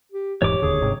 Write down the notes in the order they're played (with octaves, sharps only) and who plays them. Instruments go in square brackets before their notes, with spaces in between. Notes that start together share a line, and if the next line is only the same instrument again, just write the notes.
[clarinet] G4
[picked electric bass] E1 G#2 E3 [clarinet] G4 [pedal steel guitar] C#5 D6
[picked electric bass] E1 D#2 D3 [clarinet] G#4
[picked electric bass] G1 G#2 C3